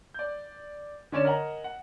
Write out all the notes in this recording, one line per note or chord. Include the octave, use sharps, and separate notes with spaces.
D5 G6
D3 C#4 C#5 D5 E7
A#4 D#5 F#5 G#5 A#5
F#5